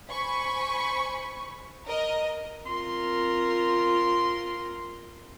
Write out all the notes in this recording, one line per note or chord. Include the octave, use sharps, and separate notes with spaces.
C5 G#5 B5 C#6
A#4 D#5
C4 F4 A#4 C6